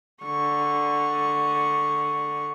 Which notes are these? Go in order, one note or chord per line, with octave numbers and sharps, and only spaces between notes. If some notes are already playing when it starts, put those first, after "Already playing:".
D3 C#6